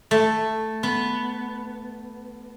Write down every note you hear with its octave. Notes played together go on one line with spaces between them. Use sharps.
A3
B3